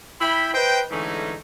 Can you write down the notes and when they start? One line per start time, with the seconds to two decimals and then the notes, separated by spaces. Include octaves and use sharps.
0.21 E4 G5 B5
0.54 B4 C5 D#5 G5
0.91 D3 E3 G#3 A3 C#4 D#4